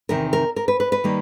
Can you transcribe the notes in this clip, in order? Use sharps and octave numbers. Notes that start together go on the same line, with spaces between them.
E2 C3 D#3 A#4
A#4
A#4
B4
B4
B4
D#3 G3 A#3